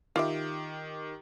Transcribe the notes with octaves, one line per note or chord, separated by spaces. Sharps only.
D#3 F4 G4 E5 D6